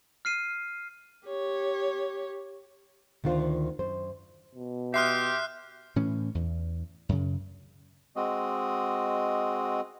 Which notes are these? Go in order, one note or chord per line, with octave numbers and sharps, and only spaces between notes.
F6 C7 D#7
G4 C#5
D2 D#3 D4 F4 C5
F#2 C5
B2
G4 E5 C6 D#6 F6 F#6 C7
A2 E3 C#4
E2
F#2 C#3
G#3 C4 F#4 D#5